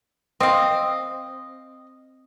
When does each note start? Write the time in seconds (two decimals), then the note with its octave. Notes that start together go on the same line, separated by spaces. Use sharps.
0.40 C4 D#5 F5